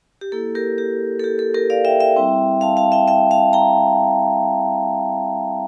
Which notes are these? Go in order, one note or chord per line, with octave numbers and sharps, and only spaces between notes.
G4
A#3 E4 A4
G4 A#4
G4
A4
G4
A4
G4 A#4
D5 F5
E5 G5
E5 G5
G3 C4 E4
F5 A5
F5 A5
E5 G5
E5 G5
F5 A5
G5 A#5